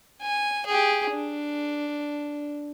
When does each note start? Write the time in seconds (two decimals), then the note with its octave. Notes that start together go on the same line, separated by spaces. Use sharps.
0.22 G#5
0.67 G4 G#4
1.11 D4